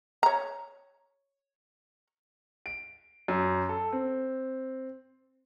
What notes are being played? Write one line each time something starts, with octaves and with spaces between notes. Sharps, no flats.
C#5 A#5
D7
F#2
A4
C4